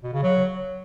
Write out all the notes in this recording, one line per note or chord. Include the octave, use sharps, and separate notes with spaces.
B2
C#3
F#3